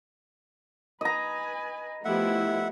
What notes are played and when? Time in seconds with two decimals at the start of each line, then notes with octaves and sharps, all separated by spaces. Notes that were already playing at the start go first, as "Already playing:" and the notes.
1.01 B4 D#5 G#5 A#5
2.05 F3 A3 B3 E4 G4 E5 F#5